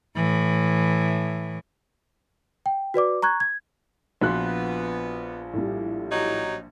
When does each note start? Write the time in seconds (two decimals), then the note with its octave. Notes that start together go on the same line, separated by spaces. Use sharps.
0.16 A2 E3
2.66 G5
2.94 F#4 B4 D5 D6
3.22 A#5 C#6 F#6 G#6
3.40 G#6
4.21 A#1 F3 B3 F#4 C6 F#6
5.53 A2 G3
6.11 F#3 D#4 G4